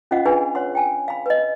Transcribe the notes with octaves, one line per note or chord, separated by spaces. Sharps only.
C#4 F4 C5 D#5 F5 F#5
D4 F4 G#4 B4 G#5 B5
C#5 F#5 C6
G5 G#5
F5 B5
B4 D#5